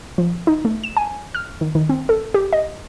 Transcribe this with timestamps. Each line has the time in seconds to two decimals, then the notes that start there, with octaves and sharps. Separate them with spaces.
0.18 F3
0.47 D#4
0.65 A3
0.84 E7
0.97 G#5
1.35 F6
1.61 D#3
1.75 D#3
1.89 C4
2.09 A4
2.34 G4
2.53 D#5